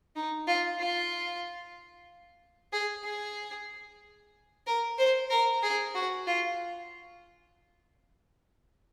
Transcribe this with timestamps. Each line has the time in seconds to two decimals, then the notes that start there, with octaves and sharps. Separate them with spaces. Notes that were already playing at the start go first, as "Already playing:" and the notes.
0.16 D#4
0.48 F4
0.80 F4
2.73 G#4
3.05 G#4
4.67 A#4
4.98 C5
5.30 A#4
5.63 G#4
5.95 F#4
6.27 F4